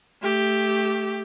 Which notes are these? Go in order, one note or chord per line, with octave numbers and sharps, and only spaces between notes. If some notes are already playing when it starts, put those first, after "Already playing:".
A3 G4